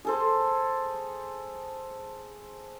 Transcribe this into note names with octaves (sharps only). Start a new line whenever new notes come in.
G#4 A4 C5